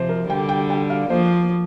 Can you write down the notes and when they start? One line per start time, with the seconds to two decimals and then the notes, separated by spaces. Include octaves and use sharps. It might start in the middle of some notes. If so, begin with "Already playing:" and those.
Already playing: C3 F3 C5
0.09 A#4
0.29 D3 G3 G5
0.49 G5
0.70 G5
0.90 F5
1.09 F3 A#3 C5